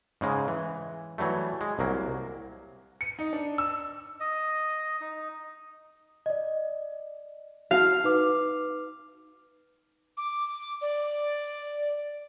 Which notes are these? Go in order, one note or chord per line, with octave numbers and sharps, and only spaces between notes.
G#2 C#3 G#3
E3
E3 F#3 G3 A3
G#3
C2 F#3 A#3
C#7
D#4
D4
E6
D#5
D#4
D5 D#5
F#4 F5
D#4 B4 D6
D6
D5